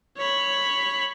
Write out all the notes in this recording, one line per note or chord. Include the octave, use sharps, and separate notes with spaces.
C#5 B5